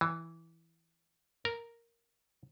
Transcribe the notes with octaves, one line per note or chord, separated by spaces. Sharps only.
E3
A#4